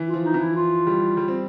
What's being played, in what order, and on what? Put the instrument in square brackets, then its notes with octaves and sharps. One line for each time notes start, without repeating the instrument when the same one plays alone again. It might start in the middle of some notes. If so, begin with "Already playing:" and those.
Already playing: [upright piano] E3
[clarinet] F4
[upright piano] F3
[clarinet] D#4
[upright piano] E3
[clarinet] E4
F4
[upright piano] G3
G3
C4